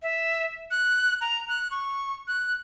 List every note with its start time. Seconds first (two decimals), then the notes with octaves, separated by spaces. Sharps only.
0.02 E5
0.71 F#6
1.21 A#5
1.49 F#6
1.71 C#6
2.28 F#6